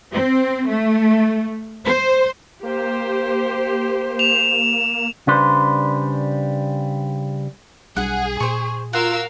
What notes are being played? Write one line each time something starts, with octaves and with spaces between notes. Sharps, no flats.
C4
A3
C5
A#3 G4 C5
E7 F7
C#3 G3 D4 B4 C5
B1 G3 D4 G#4 F#5
A#2 C5 C#6
F4 F#4 A#4 F5 E6